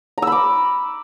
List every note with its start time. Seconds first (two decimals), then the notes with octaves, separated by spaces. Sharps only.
0.18 A#5
0.22 E6
0.27 B5
0.32 D6